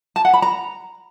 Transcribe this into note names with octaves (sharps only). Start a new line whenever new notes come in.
A5
F#5
B5
A#5